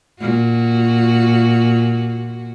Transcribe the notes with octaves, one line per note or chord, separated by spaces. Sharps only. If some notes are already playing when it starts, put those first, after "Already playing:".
A#2 F#4